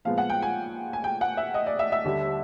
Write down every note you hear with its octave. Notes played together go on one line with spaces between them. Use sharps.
A#2 F3 G#3 B3 F5
F#5
G5
G#5
G#5
G5
F#5
E5
D#5
D5
E5
E5
D#2 D3 G3